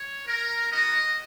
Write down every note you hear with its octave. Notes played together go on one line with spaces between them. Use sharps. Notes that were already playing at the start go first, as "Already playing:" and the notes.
Already playing: C#5
A#4
B3 D#4 F#4 D#5